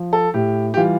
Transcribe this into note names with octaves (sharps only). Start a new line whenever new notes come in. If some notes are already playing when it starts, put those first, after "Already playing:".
Already playing: F3
A4
A2 G4
G4
E3 G3 F4